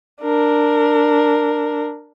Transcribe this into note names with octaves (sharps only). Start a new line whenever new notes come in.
D4 A#4